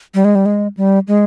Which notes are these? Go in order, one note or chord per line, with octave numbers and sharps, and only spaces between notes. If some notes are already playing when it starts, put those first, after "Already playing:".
G3
G#3
G3
G#3
G3
G#3